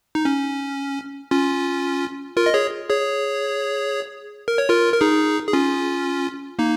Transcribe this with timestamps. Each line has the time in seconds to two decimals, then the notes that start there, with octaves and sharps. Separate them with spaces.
0.15 D#4
0.25 C#4
1.31 C#4 F4
2.37 F4 A#4
2.46 D#5
2.54 G#4 C#5
2.90 G#4 C#5
4.48 A#4
4.58 C#5
4.69 F4 A#4
4.93 A#4
5.01 D#4 G#4
5.47 G#4
5.53 C#4 F4
6.59 A#3 D#4